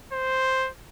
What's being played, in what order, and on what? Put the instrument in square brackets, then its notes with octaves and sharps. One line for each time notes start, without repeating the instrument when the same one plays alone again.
[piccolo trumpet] C5